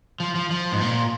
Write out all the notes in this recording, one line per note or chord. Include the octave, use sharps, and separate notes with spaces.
F3
F3
F3
G#2
A#2